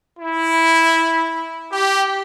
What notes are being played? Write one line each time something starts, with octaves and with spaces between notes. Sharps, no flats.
E4
G4